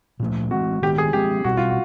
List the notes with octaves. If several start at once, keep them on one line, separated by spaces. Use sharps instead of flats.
A#2 F3 A3
E3 G#3 C4 F#4
D#3 G#3 B3 G4
G#4
F3 G#3 C4 G4
B2 G3 C4 F#4
F4
F#4